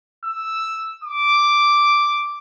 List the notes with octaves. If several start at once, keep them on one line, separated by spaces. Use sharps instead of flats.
E6
D6